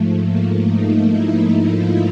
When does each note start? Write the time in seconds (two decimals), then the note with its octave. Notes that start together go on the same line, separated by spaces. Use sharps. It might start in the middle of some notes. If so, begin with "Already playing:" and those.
Already playing: G#2 F3 A3
0.24 A#3
0.68 D#4
1.12 E4
1.42 E4
1.71 F4